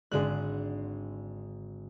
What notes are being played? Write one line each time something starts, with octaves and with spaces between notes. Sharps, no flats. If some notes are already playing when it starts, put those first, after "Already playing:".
G#1 D3 G#3 D4 G#4 F#6